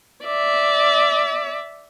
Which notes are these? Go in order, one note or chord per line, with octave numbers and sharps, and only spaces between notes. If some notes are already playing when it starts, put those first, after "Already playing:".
D5 E5